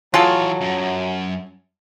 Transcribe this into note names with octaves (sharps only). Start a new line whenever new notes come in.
E3 F#3 F4 G#4 A4 C#5
F#2